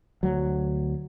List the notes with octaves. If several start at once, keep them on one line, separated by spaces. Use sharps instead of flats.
D2 F#3